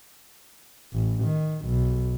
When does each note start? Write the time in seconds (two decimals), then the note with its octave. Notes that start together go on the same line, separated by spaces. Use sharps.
0.93 A1
1.24 D#3
1.66 B1